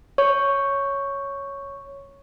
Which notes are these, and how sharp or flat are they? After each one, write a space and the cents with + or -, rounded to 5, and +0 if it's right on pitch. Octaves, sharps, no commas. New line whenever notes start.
C#5 +0 C#6 +0